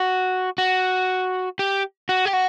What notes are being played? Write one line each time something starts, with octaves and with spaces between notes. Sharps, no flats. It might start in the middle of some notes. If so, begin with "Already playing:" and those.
Already playing: F#4
F#4
G4
F#4
G4
F#4